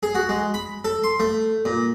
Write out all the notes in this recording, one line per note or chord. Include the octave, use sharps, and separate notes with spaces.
G#4
F#4
G#3
B5
A4
C6
A3
A#2